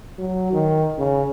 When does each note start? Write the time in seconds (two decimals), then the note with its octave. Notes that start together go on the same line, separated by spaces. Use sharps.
0.18 F#3
0.52 D#3
0.98 C#3